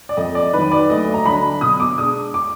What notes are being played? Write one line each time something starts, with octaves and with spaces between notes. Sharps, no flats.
D5
F2 D#5
D5
D#3 F#3 B4
D5
D2 D#5
A#5
D3 F#3 D4 B5
B2 D#6
D6
G#3 D4 D#6
D6